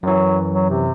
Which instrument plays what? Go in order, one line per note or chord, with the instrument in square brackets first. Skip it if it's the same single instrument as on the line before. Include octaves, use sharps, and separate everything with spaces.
[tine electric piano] F#2 E3 [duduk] F#3
[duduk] F#3
C3